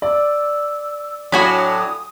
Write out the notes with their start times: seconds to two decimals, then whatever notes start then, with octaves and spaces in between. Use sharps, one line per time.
0.02 D5 E6
1.32 A2 F#3 D4 F#4 G#5 B5 D#6